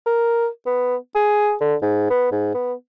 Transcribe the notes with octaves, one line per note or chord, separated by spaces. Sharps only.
A#4
B3
G#4
D3
G#2
B3
G#2
B3